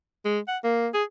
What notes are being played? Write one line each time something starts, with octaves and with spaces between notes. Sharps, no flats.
G#3
F#5
A#3
G#4